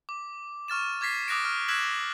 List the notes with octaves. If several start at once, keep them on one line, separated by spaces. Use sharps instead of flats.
D6
C#6 F6 A6 E7
D6 G#6 A6 B6 C7
D6 D#6 F#6 A#6 D7
F6
E6 F#6 G#6 B6 E7 F#7